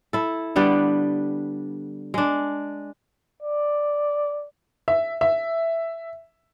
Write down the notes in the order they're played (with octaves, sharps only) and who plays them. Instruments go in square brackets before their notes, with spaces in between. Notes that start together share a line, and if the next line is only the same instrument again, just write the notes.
[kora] E4 A4
D3 G3 B3 D4
G#3 D4
[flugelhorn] D5
[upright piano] E5
E5